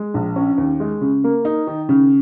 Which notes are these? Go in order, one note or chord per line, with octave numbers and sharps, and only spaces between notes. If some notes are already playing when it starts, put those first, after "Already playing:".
Already playing: G#3
A#1
C#4
D#2
G#3
C#3
A#3
D#4
D#3
C#3